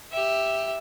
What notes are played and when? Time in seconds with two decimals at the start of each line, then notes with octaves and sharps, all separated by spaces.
0.12 G4 E5